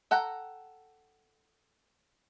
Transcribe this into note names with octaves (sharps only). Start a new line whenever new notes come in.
A4 F#5 G5 A#5